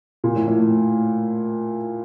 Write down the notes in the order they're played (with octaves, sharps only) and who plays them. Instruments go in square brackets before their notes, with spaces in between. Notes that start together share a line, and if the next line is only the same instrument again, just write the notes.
[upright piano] A#2
A2
A2
A2